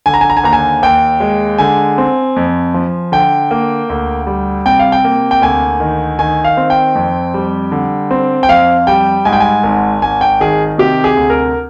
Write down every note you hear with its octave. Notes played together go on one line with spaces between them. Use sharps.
D3 G#5
A#5
G#5
A#5
G#5
D#2 A#5
G#5
D#2 G5
G#3
D3 G#5
C4
F2
F3
D3 G5
A#3
D2
G3
C3 G5
F5
G5
A#3
G5
D2 G#5
D#3
D#3 G#5
F5
C4
G5
F2
G3
D3
C4
G5
F2 F5
G3 G5
G#2 G#5
G5
G#5
G#1
G#1 G#5
G5
D#3 G#4
C3 G4
G#4
D2
A#4